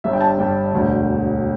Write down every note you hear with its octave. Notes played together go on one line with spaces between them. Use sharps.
G1 G2 G3 E5
G5
A5
G1 G2 G3 G5
E1 D2 D3